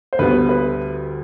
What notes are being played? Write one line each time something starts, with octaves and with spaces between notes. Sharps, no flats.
C5
D2 D3 G3 B3 B4
B4